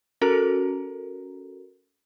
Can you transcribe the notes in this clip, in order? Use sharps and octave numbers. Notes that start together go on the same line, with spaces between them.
C#4 F#4 A4 A#4 A#5